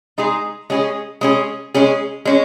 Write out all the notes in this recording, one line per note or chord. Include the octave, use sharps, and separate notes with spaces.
G#3 D#4 G#4
G#3 C#4 G#4
G#3 C#4 G#4
G#3 C#4 G#4
G#3 C#4